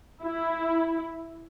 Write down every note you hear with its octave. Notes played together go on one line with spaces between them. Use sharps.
E4